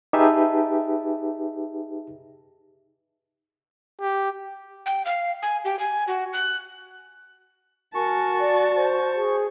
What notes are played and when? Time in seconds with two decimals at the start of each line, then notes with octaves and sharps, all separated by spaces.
0.13 D#4 G4 G#4 B4 E5 A5
4.00 G4
4.86 G5
5.05 F5
5.42 G#5
5.65 G4
5.79 G#5
6.08 F#4
6.33 F#6
7.95 F#4 A#4 G#5 A5 C#6
8.39 D5
8.76 C5
9.16 G#4